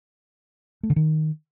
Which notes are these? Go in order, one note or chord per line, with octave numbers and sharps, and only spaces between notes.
A3
D3
D#3